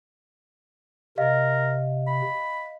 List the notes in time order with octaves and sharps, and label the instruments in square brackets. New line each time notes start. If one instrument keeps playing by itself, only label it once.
[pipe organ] C3 [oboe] A#4 [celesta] D#5 F5
[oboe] B5